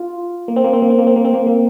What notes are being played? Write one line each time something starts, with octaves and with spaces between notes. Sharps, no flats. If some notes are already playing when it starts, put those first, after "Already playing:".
Already playing: F4
A#3
C4
A#3
C4
A#3
C4
A#3
C4
A#3
C4
A#3
A#3